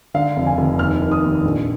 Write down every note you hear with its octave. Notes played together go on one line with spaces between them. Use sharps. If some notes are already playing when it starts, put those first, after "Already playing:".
D3 F5
F1
G#5
F1
D#2 F6
D#3
D#6
D#2
A#1